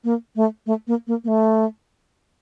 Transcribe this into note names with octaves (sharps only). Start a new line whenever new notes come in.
A#3
A3
A3
A#3
A#3
A#3
A3